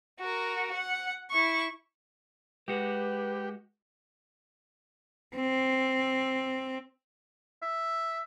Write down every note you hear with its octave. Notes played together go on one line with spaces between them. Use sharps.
F#4 A#4
F#5
E4 C#6
G#3 F#4 G4 B4
C4
E5